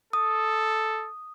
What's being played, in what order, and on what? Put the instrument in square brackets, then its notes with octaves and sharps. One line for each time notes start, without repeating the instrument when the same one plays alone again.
[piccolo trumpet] A4 [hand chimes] D#6